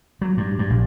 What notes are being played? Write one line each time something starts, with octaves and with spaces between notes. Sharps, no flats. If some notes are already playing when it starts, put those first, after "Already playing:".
F#3
G2
G2
A#1